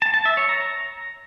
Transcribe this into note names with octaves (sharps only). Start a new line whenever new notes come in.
A5
A5
E5
C#5
A#5